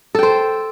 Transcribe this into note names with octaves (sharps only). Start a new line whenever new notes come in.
A4 C5 G5